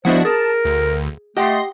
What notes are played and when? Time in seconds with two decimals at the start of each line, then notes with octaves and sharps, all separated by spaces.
0.05 F3 B3 D4 E4 F#4 C5 D#5
0.25 G#4 A#4 A5
0.65 D2
1.37 A3 G4 D#5 F#5 G5 C6